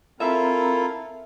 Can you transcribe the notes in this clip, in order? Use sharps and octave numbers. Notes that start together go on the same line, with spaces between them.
C4 E4 F4 A4 A#4 E5 A#5